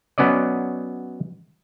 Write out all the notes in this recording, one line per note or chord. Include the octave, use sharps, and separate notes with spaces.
F#3 B3 C#4 D5 D#5